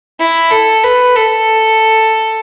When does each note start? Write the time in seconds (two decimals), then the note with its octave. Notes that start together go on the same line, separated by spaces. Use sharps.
0.20 E4
0.51 A4
0.83 B4
1.16 A4